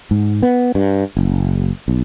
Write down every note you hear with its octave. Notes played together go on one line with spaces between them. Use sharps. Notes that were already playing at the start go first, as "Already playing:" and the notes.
G#2
B3
G2
F#1
B1